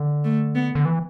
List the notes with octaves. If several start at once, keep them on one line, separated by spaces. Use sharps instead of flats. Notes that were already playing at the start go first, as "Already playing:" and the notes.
Already playing: D3
A3
B3
D3
E3